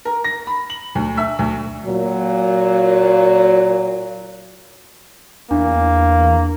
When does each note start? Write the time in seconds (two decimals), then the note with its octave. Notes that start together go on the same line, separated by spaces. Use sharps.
0.05 A#4
0.24 A#6
0.47 B5
0.70 F#7
0.95 D2
1.17 E5
1.39 D2
1.85 A#2 F#3
5.51 E2 A#3 D4